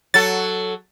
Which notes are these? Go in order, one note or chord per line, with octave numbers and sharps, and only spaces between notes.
F#3 A4 A6